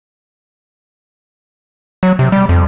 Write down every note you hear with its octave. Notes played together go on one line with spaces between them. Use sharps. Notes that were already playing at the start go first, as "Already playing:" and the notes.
F#3
C3
G3
F2